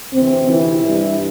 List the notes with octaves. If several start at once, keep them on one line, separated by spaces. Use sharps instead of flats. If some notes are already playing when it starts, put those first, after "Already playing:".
D2 C3 E3 C4
E3 E4
G2 E3 G3